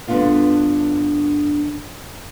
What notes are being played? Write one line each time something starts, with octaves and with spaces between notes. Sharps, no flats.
G2 D3 B3 D4 F4 D5